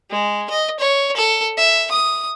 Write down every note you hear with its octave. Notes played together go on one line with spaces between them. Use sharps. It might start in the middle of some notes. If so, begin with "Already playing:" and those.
G#3
D#5
C#5
A4
E5
D#6